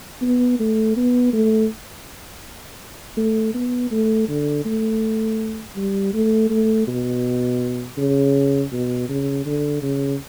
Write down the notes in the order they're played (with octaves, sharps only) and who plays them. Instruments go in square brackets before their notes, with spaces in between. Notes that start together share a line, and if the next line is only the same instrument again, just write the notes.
[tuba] B3
A3
B3
A3
A3
B3
A3
D3
A3
G3
A3
A3
B2
C#3
B2
C#3
D3
C#3